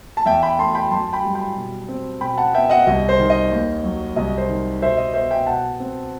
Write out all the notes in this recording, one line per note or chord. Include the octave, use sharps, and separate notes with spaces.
A5
E2 E5 G5
G5 B5
A3 A5 C6
G5 B5
F#2 A5 C6
G5 B5
G3
G5 B5
B2
C4
B2 G5 B5
F#5 A5
B3 E5 G5
D#5 F#5
C2 D#5
C5
D#3
D#5
D#2
F#3
C2 D#5
C5
D#3
B2 C5 E5
D#5
B3 C5 E5
E5 G5
B2 F#5 A5
C4